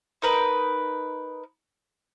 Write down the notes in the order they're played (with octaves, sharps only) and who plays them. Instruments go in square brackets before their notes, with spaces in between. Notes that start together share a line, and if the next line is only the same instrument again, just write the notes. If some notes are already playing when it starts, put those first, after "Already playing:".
[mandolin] D#4 A#4 B4